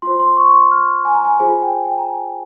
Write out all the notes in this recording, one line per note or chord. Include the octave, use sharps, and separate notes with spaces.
F4 C5 C6
C6
C#6
C#6
C6
F6
G#5
A#5
G#5
F4 G#4 C5 G#5
G5
G5
A#5
G#5